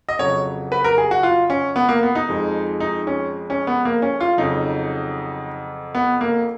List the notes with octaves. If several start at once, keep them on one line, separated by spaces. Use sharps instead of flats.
D#5
F2 C#3 F#3 C#5
B4
A#4
G#4
F#4
F4
C#4
B3
A#3
B3
D#4
F2 F3 G#3
D#4
C#4
C#4
B3
A#3
C#4
F4
F2 C#3 F#3 D#4
B3
A#3